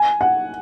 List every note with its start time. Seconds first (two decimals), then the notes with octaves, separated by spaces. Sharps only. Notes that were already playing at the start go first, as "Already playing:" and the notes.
Already playing: G#5
0.21 F#5